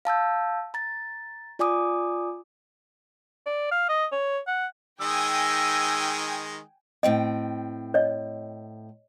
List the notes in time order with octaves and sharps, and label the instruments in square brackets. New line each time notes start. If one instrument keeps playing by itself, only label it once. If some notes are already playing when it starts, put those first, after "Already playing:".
[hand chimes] F5 A5 E6 G6
A#5 A6
F4 D5 G#5 D6 D#6
[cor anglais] D5
F5
D#5
C#5
F#5
[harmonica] D#3 G#3 D#5 [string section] G5 G#5 [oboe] E6
[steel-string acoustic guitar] A2 C4 G5 [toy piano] D#5
[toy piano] C#5 D#5